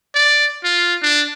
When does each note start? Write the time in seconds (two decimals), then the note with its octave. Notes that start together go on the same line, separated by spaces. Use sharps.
0.15 D5
0.64 F4
1.02 D4